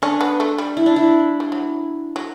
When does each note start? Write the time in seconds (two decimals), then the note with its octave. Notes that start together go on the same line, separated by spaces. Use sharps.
0.02 C#4 D4
0.21 B3
0.40 A3
0.58 G3
0.77 E4
0.86 D4
0.96 E4
1.40 G3
1.52 F#3
2.16 F#3